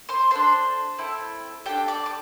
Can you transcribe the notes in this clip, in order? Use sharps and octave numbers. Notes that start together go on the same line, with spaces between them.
C5 C6
D4 A4 C5 C6
C4 E4 A4
D4 G4 A4 G5
D5 D6
D6